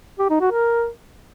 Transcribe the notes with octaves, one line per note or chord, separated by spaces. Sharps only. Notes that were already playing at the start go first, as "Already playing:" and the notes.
G4
D#4
F#4
A#4